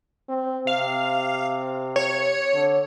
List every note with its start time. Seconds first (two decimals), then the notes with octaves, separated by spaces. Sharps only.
0.29 C4
0.67 C3 F5
1.96 C#5
2.54 D3